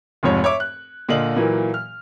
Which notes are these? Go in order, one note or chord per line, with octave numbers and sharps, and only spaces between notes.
F1 F2 G#2 C#5
C#5 E5 D6
F#6
A#2 D3 F4 D#5 F#7
A#2 E3 F#3 A#3
F6